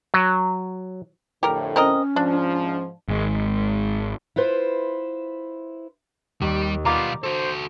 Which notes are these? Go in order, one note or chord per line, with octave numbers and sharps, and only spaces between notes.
F#3
F2 A2 D3 G4 A#4
C4 C#4 A#4 D#5
G#2 F3 D4
G#1 G#3
E4 F4 B4 C5
D#2 G3
B1 G3 B3 F4 F5 A#5 D6
F#4 A4 C5